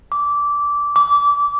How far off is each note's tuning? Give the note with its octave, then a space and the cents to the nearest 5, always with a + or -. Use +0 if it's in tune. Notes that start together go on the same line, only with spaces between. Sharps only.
D6 -15
D6 -25